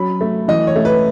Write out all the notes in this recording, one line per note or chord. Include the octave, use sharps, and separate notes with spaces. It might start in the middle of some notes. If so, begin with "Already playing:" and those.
Already playing: F#3 C#4 B5
A3
E3 D#5
C#5
A3
B4